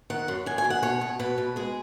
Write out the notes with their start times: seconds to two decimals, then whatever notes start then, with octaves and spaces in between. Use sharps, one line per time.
0.10 D#3 F#5
0.28 F#2
0.46 F#2 G#5
0.58 G#5
0.64 D#3
0.70 F#5
0.82 B2 C#5
1.01 B2
1.19 B2 B4
1.38 B2
1.56 G#3 G#4